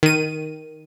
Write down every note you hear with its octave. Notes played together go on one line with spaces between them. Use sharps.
D#3 D#7